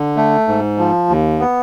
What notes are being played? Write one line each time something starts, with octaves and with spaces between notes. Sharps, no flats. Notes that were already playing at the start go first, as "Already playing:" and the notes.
Already playing: D3
A3
G#2
F3
D#2
B3